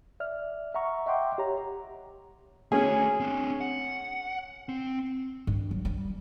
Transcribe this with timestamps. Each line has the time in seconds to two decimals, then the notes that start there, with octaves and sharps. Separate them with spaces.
0.20 D5 E5 F6
0.74 E5 F#5 A#5 C#6
1.06 D#5 E5 F#5 G5 C6 D6
1.38 G4 C#5 A#5
2.72 A3 C#4 F#4 G#4
3.20 C4 D4
3.61 F#5
4.69 C4
5.47 G2
5.71 F#3
5.85 G3